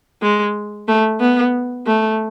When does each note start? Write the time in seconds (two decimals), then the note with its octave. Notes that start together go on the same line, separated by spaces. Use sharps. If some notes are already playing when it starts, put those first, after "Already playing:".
0.22 G#3
0.88 A3
1.20 B3
1.87 A3